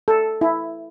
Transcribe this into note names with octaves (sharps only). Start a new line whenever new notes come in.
A4
E4